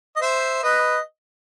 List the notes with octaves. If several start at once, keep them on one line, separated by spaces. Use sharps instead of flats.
D#5
C5 E5
B4 D#5